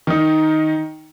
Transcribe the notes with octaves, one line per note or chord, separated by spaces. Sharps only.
D#3 D#4